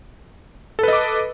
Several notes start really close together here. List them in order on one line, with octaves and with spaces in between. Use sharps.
A4 B4 D#5 D6